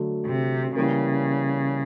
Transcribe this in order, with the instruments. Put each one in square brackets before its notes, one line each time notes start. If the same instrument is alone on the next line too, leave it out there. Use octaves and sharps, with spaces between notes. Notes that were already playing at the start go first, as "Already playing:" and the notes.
Already playing: [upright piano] D3 F#3 A3
[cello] C3
[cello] C#3 [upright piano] E3 G3 A#3